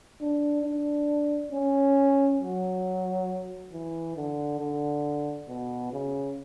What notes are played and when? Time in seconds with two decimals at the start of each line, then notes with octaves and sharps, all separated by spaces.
0.21 D4
0.65 D4
1.52 C#4
2.41 F#3
3.72 E3
4.16 D3
4.60 D3
5.48 B2
5.92 C#3